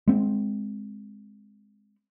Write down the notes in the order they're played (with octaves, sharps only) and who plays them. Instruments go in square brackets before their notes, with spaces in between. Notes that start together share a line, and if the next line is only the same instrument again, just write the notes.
[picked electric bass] G#3 C4